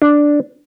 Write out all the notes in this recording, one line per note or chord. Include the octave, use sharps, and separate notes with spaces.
D4